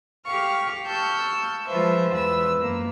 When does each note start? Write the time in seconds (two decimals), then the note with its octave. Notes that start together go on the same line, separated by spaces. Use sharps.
0.26 G4 F5 C#6 F6
0.87 A5 C#6 E6 F6 G6
1.67 F3 G#3 F4 B4 C5 E5
2.11 E2 B4 E6
2.58 F#2 A#3